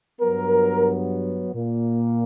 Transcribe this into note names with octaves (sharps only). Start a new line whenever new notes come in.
G2 F#3 B3 A#4
A#2 A#3